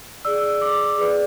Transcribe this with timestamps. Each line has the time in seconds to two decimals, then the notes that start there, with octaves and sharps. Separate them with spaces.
0.25 G#4 D5 E6
0.61 D6
0.98 G#4 B4 D5